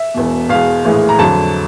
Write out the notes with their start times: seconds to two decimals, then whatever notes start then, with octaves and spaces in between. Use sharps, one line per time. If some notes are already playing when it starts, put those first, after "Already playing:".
Already playing: E5
0.15 E1 E2 B2
0.49 E2 B2 G#3 F5
0.85 A#1 A2 E3 G#3
1.09 A#5
1.19 F2 D3 F#3 A5